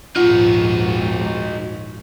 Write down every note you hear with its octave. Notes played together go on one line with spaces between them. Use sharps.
A#1 D#2 G#2 D#4 F4 F#4